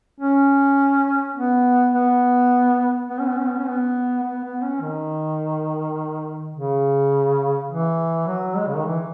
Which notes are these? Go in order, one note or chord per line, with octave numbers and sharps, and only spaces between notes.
C#4
B3
B3
B3
C#4
B3
C#4
B3
C#4
B3
B3
B3
C#4
D#3
C#3
E3
F#3
G#3
C#3
D#3
E3